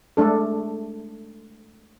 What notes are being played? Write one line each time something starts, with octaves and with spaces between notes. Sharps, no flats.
G#3 A3 D4 A4